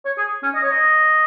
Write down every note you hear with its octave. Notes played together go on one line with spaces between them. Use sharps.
C#5
G#4
C#4
D#5
C#5
D#5